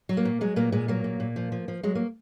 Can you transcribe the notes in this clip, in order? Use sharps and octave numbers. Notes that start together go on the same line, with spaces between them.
F#3
A#3
A#2
F#3 G#3
A#2 A#3
A#2 G#3
F#3 A#3
A#2
A#2
F3
F3
F3
F#3 G#3
A#3